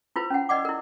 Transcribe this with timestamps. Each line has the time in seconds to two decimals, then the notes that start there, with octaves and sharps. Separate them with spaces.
0.16 E4 F4 B4 C5
0.30 C#4 F#5
0.49 B4 D5 D#5 F#5 D6
0.65 E4 A#4